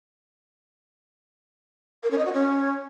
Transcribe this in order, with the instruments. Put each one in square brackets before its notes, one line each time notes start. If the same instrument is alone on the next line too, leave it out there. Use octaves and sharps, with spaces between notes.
[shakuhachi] A#4
C#4
D#5
F#4
C#4